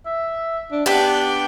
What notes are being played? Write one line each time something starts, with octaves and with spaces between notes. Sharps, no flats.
E5
D4
B3 D4 G4 G5